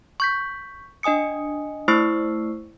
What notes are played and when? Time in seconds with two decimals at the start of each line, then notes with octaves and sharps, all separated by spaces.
0.20 C#6 G6 B6
1.03 D4 D#5 G#5 D#6 C#7
1.88 A3 E4 C5 C#6 E6 C7